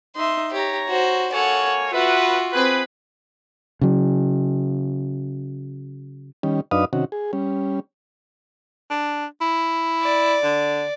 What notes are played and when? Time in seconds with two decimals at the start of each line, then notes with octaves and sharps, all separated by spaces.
0.16 D#4 E5 C6
0.53 G4 C#5 A#5
0.89 F#4 C5
1.33 A#3 A4 C#5 F#5 G#5
1.92 F4 F#4 B4 E5 F#5
2.53 C4 G#4 B4 G5
3.81 C#3 F#3
6.43 D#3 G3 C#4
6.71 F#2 D4 D#4 B4 F5 D#6
6.93 C3 D#3 C#4 F#4
7.12 G#4
7.33 G3 C#4
8.90 D4
9.41 E4
10.02 D5
10.43 D3